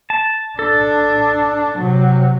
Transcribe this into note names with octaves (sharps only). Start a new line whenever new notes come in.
A5
D4 A4
C3 F#3